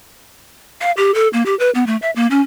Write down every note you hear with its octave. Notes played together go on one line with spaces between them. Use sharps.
F5
G4
A4
A#3
G4
B4
B3
A3
E5
A#3
C#4